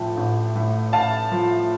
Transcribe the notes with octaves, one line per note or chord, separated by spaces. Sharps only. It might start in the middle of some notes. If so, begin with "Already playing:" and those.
Already playing: A1 A2 F3 G5 A5
A1
A2
A1 F5 A5
F3